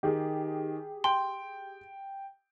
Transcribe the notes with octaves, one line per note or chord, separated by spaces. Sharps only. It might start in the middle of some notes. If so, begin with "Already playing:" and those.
D#3 G4 G#4
G5 C6